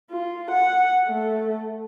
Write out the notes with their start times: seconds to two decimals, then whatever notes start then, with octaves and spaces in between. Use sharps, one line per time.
0.11 F4
0.51 F#5
1.07 A3